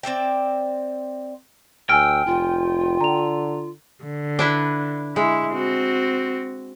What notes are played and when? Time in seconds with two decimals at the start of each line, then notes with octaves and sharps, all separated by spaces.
0.03 C4 D5 E5 G5
1.89 D2 G5 G#5 E6 F6
2.26 F1 F4
3.01 D3 A#5 F7
4.04 D3
4.39 D4 E4 B4
5.16 G#3 E4
5.52 C4 F#4